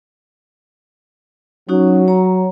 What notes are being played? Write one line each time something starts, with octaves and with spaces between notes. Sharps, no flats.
F#3 C#4 D#4 F#4
C#5 A#5